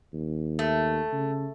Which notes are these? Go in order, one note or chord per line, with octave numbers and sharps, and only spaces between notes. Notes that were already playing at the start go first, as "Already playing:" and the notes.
D#2
A3
C#3